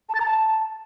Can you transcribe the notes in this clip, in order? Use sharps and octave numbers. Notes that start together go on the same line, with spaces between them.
A5
A6
A#5
A5